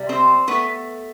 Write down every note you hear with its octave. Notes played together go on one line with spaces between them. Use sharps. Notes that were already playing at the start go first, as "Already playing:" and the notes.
Already playing: C3 G3
C4 C5
A3 B3 B4